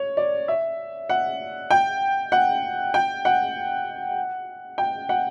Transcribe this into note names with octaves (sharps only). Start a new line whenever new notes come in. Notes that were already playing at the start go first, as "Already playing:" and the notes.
Already playing: C#5
D5
E5
F#5
G5
F#5
G5
F#5
G5
F#5